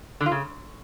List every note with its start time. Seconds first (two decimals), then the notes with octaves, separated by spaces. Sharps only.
0.21 D3
0.26 F4
0.31 C#3